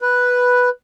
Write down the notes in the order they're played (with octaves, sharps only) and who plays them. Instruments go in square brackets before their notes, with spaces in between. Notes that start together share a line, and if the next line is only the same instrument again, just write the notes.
[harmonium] B4